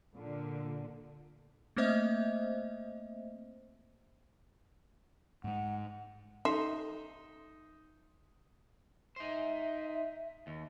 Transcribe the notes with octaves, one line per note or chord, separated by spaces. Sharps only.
A#2 D3
A3 A#3 C4 C5 D#5 E5
G#2 G#3 F#5
D#4 A4 E5 C6
D#4 C5 E5
D#2